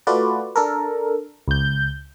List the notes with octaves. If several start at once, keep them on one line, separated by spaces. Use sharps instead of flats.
A3 F4 F#4 B4 D5
D4 A4 A#4
C#2 G6